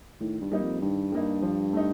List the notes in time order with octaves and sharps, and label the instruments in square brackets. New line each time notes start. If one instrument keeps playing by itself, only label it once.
[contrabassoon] A2 [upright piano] D#3
[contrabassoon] G2
[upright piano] G3 A#3 D#4
[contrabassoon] F2
[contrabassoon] G2 [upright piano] D#3
[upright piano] G3 A#3 D#4
F3
A3 D#4